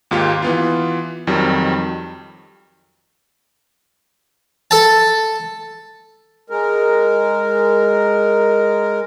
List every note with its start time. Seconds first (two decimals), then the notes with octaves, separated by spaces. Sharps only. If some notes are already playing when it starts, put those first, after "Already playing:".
0.11 D#2 G#2 F4 G4
0.42 E3 B3 F4
1.27 F2 D#3 F#3 G3
4.71 A4 A5
6.50 G#3 A#4